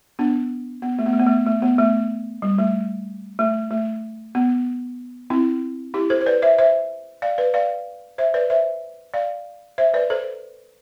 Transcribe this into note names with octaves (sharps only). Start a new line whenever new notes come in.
B3 D4
B3
A3
B3
A3
B3
A3
A3
B3
A3
G3
A3
A3
A3
B3
C4 E4
E4 G4
A4 C5
C5
B4 D5
C5 E5
C5 E5
D5 F5
B4 D5
D5 F5
C5 E5
B4 D5
C5 E5
D5 F5
C5 E5
B4 D5
A4 C5